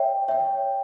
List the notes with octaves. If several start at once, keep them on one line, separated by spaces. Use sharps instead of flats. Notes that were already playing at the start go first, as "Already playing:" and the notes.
Already playing: C#5 E5 G5
C#5 E5 G5